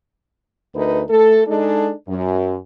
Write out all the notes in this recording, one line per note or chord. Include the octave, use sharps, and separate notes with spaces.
D2 D#4 A#4 B4
A3 A4
G#3 D4 D#4 G#4 A4
F#2